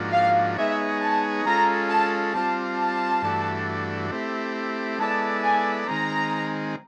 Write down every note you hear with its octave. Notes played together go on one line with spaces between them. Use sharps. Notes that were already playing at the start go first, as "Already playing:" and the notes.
Already playing: G#2 F3 A#3 D4 F#4
F5
G#3 B3 D#4 G#4 C#5 E5
A5
G#3 C#4 F4 A4 A#5
A5
G3 C4 F4 A5
A5
G2 E3 A3 D4 F#4
A3 C4 E4 G4
G#3 B3 E4 A4 D5 A5
G#5
D#3 G#3 C4 A#5